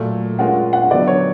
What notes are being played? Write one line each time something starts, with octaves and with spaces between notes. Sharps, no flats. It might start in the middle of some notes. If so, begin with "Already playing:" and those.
Already playing: A#2 F#3 A3
G#3 C#4 F4 A#4 F#5
F#5
D3 F#3 B3 D5
C#5